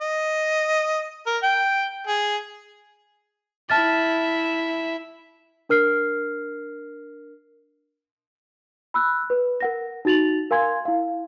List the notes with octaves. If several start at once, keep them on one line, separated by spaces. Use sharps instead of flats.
D#5
A#4
G5
G#4
E4 E5 A5 F6 A6
D4 A#4 F6 C7
B5 E6 F#6
B4
A#4 F#5 A#6
D#4 F#4 A6 F7 F#7
A#4 F5 G#5 C6 G#6
E4 F5